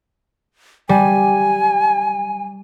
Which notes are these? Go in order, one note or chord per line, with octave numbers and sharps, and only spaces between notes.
G3 G#5